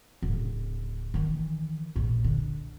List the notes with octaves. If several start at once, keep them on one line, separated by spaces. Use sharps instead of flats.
D1 C#3
D#3 E3
A#1 A#2
D3